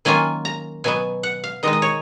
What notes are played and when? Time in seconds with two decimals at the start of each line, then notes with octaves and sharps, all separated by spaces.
0.05 D#3 F#3 A#3 C#4 F4 G#5
0.45 A#5
0.84 B2 F#3 B3 G#5
1.23 F#5
1.44 F5
1.63 D#3 G#3 D#4 D#5
1.73 D#5
1.82 C#5